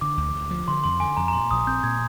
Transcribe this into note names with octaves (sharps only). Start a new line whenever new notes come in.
D3 D6
D2
D2
F3
D3 C6
F2 C6
D3 G#5
F2 A#5
A#5
A#2 C6
A#1 D#6
C4 G6
A#2 G#6